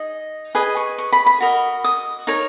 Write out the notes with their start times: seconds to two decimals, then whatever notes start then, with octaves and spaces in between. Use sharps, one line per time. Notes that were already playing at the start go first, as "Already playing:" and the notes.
Already playing: D#4 G#4 D#5
0.55 G#4 B4 D#5 G#5
0.77 C#6
0.98 C#6
1.13 B5
1.26 B5
1.40 F#4 A#4 D#5
1.84 D#6
2.27 D#4 A#4 C#5